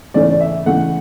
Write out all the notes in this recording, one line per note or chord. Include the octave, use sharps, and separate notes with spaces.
C#3 E3 A3 C#4 D5
D5
E5
C#3 E3 A3 F#5